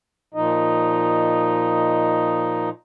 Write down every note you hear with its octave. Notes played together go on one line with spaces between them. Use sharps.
A#2 F3 D#4 D#5